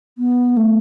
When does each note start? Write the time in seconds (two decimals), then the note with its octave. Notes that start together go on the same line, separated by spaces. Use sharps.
0.18 B3
0.57 A3